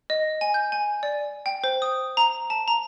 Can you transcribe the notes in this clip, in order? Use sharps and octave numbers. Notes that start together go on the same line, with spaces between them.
D#5
G#5
G6
G#5
D5
G5
C5
D#6
A#5
A5
A#5